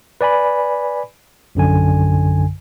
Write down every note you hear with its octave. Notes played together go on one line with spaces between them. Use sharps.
B4 D5 G#5 B5
A#1 F#2 D3 G#5